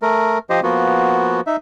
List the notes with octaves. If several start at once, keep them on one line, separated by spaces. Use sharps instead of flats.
A3 A#4
F3 G4 C5 D#5
F3 A#3 B3 F#4
D#4 E5